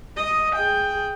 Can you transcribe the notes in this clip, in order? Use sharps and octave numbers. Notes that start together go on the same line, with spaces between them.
D#5
G#4 G5